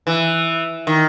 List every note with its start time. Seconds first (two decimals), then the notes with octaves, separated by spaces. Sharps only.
0.07 E3
0.87 D#3